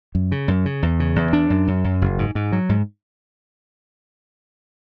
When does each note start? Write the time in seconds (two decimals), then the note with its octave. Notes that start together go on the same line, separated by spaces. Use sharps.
0.15 F#2
0.32 C#3
0.48 F#2
0.65 C#3
0.82 E2
1.00 C#3
1.16 E2
1.33 D4
1.50 F#2
1.68 F#2
1.84 F#2
2.02 F#1
2.18 G#2
2.35 G#2
2.52 F#3
2.69 G#2